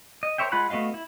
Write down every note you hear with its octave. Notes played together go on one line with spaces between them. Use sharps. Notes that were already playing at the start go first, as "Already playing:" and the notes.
D#5
A#4 C5 C#5 E5 G5
G#3 F4 F#5 B5 F#6
A3 B3 F#4 D#5 F5
E4